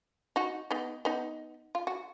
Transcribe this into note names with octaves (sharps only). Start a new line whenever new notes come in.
D#4 F#4
B3 D#4
B3 D#4
F4
F#4